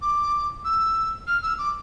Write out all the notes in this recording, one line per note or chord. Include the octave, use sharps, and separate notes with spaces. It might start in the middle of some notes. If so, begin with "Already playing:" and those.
D6
E6
F6
E6
D6